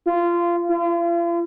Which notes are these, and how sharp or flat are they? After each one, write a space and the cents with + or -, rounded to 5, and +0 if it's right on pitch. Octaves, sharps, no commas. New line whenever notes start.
F4 -20
F4 -40